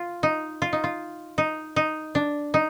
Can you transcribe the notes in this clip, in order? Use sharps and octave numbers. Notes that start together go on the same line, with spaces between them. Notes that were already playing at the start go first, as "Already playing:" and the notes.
Already playing: F4
D#4
F4
D#4
F4
D#4
D#4
D4
D#4